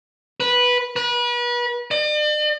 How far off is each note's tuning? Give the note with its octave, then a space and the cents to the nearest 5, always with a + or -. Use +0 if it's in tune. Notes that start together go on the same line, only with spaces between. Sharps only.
B4 -10
B4 -35
D5 +45